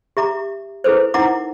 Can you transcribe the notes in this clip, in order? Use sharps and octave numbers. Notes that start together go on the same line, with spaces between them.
G4 E5 A#5 D6
E4 G#4 A4 B4 C5
D#4 E4 A#4 F#5 A#5 D6